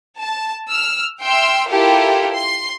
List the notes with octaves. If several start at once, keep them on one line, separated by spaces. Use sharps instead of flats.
A5
E6 F6
E5 G5 C6 E6 F6
E4 F4 G4 A4 A#4
C6 C7